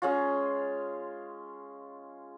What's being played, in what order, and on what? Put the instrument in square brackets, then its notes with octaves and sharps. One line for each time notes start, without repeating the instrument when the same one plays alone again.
[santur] G#3 C#4 F4